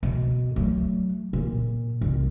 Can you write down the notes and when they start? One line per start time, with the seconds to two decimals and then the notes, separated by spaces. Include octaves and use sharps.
0.03 B2
0.56 F#3 A3
1.33 A#2
2.01 C2